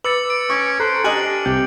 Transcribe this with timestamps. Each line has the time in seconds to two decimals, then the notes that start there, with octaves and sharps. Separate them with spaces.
0.04 B4 D6 E6 A6 C#7 F#7
0.30 D7
0.50 C#4 C#6
0.80 A4 C5 A#5 F#6
1.04 D4 G4 D#5 G#5 F6 F#7
1.46 C2 C3 G4 G6